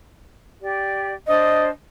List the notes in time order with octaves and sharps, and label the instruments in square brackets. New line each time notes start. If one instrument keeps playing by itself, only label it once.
[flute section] G4 D5
[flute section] D4 C5 D5 [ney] D#5